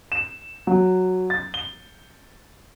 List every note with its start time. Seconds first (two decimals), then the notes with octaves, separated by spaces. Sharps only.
0.12 E7
0.67 F#3
1.30 A6
1.54 G7